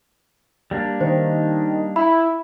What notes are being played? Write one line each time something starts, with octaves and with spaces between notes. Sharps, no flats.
G3 A#3 D4
D#3 C5
E4 B5